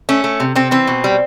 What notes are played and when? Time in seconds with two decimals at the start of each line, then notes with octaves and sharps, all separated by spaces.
0.09 A3 C#4
0.24 A3
0.40 C3
0.55 C3 C4
0.71 E3 C4
0.87 B2
1.04 G3